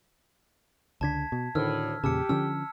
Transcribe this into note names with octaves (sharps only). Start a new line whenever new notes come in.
C#2 D3 A5 G#6 B6
B2
D2 A2 D3 D#3 E6 F6
E2 A#2 C#3 G4 A5 E6 C#7
D3 F3 C#4 E6